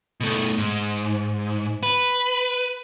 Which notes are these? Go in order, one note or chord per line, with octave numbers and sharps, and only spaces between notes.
B2 A3
G#2
B4